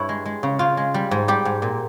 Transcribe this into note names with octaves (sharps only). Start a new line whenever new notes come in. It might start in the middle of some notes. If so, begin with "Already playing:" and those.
Already playing: G2 E4 C#5
G#3
G#3
C#3
C#3 F4
G#3
G3
G#2
G3 G4
G#2
A#2